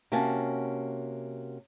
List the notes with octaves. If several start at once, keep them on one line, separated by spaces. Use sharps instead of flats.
C3 A#3 C#4 F#4 G#5 A5